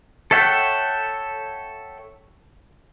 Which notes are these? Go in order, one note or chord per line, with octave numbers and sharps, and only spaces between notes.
A4 C#5 E5 F#5 G5